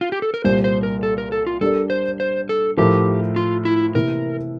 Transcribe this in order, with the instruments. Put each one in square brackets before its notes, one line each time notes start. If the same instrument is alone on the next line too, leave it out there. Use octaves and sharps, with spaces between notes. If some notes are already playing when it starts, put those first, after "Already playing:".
[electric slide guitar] F4
G4
A4
A#4
[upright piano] C2 A#2 G3 [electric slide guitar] C5
[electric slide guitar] C5
A#4
A4
A#4
A4
F4
[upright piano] G3 D4 G4 A#4 D5 [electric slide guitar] A4
[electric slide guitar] C5
C5
A4
[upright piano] A2 F3 A3 E4 A#4 [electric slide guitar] G4
[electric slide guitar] F4
E4
[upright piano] C3 E3 A#3 E4 [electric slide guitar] A#4